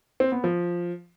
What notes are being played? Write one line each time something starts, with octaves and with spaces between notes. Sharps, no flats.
C4
B3
F3